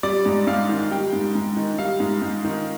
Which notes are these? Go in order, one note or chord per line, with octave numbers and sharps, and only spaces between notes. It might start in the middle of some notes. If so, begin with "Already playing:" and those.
G3 D5
G#2
G#2 F5
D#3
G3 G5
G#2
G#2
D#3
G3 F5
G#2
G#2
D#3